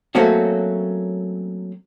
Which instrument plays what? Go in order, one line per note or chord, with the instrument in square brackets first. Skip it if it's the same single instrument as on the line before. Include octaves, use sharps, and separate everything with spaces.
[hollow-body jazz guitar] F#3 A3 A#3 C4 C#4 F#4